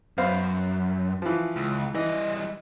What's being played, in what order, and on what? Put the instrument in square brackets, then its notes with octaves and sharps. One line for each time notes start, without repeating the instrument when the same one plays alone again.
[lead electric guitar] F#2 [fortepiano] B3 C5 F5
[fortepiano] E3 F3
[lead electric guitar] C#2
[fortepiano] E3 [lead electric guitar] G3 D#5